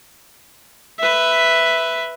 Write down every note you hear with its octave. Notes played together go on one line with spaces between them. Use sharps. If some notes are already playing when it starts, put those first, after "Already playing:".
B4 E5